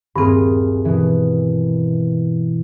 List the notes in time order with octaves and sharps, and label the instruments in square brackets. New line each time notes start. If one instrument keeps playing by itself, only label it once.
[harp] D#1 G#4 F6 [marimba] G2 C4
[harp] B2 E3